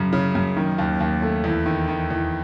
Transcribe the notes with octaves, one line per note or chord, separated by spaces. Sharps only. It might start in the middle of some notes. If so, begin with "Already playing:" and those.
Already playing: F#2 C#3
C#3
F#2
D#3
D#2
D#2
A3
E2
D#3
D#3
E2